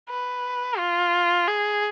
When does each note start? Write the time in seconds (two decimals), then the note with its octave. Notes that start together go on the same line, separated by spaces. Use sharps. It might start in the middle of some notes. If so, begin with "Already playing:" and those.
0.09 B4
0.78 F4
1.48 G#4